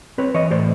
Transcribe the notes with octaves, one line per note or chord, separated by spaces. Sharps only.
C4 B4 C#5
E3 C#5 D#5
A2 C5 D5